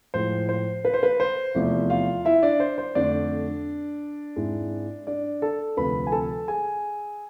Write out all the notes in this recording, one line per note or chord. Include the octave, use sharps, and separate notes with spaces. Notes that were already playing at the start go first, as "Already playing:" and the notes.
A2 F3 G#3 C5
C5
B4
C5
B4
C5
E2 C3 F3 A3 E4
F4 F5
E4 E5
D4 D5
C5
C5
F2 D3 A3 D4 D5
G#2 G#3 C4 E4
D4 D5
A4 A5
D2 C3 F3 B4 B5
G#5
A4 A5
G#4 G#5